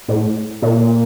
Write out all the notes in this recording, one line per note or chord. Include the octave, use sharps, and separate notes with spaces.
A2
A#2